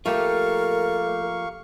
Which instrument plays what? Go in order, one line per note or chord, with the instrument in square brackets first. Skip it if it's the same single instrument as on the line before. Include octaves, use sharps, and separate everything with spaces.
[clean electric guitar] F3 A#3 G4 [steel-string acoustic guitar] A3 [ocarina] A#4 [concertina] F5 C#6